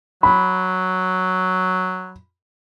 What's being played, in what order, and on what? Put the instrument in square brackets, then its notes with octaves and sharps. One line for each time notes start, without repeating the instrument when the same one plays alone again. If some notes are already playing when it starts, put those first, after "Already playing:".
[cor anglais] F#3 [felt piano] B5